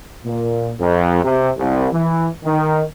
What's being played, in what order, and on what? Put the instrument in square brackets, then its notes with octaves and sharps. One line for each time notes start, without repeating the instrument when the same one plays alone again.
[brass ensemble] A#2
F2
C3
C2
E3
D#3